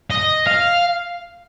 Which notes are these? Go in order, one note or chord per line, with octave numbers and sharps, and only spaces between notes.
D#5
F5